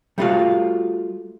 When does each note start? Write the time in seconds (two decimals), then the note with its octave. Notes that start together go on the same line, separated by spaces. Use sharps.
0.18 G3 A3 D#4 F4 F#4 F5